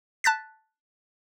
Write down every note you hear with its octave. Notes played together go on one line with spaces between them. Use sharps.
A5 F#6 A6 B6